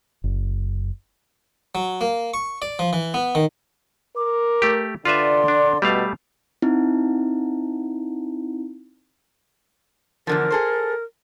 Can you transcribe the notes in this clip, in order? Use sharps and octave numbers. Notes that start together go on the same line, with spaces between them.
F#1
F#3
A#3
C#6
D5
F3
E3
B3
D#3
A#4 D6
A3 G4
D3 F4 B4 D5 E5 C6
D4
B2 G3 A3 F5
C4 D#4 E4
E2 D3 F3 A#4
G#4 A4 C5